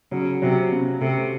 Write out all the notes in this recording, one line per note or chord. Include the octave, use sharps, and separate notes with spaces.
C#3 F#3
C3 F#3
C#3
C3 A3